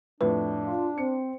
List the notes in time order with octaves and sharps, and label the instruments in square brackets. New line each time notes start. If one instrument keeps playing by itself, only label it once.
[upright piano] F2 A2 [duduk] D4 [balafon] B4
[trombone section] F4
[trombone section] C4 [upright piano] C#7